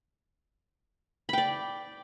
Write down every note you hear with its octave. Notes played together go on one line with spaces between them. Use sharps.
D5 G5 B5